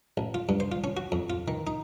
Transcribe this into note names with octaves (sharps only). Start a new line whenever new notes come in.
A1
F4
G2
C5
F4
C#4
F#4
F2
F4
D#3
D#4